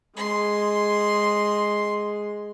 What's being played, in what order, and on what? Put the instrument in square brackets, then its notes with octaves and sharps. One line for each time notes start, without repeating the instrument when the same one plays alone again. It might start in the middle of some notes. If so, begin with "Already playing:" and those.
[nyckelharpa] G#3 [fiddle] C6